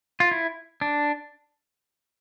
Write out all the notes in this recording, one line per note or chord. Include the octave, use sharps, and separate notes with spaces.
F4
E4
D4